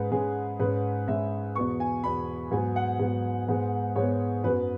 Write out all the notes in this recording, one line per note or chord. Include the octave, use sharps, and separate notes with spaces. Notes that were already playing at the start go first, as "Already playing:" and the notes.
Already playing: G#2 G#3 C#4 B4
G#2 G#3 C#4 G#4
G#2 G#3 C#4 B4
G#2 G#3 C#4 E5
E2 B2 B3 C#6
G#5
E2 B2 B3 B5
G#2 F#3 B3 G#5
F#5
G#2 F#3 B3
G#2 G#3 B3
G#2 G#3 B3 C#5
F#2 F#3 B3 B4